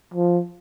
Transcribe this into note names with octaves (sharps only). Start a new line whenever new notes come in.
F3